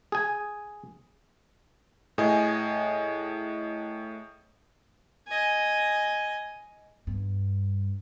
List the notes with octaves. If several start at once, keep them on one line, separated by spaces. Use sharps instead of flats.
G#4 G#5
A2 G#4 D#5 G#5
D#5 G#5
G2